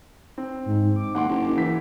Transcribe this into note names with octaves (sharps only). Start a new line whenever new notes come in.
C4
G#2
D6
D#2 F#5 C6
F#1
E3 B6